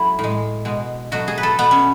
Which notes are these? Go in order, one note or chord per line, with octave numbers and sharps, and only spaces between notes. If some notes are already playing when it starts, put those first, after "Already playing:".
Already playing: F#3 A3 E4
A2 G#3
B2 G#3
B2 F#3 A3 F#4
G#4
B4
A4
B2 A3 B3
C#4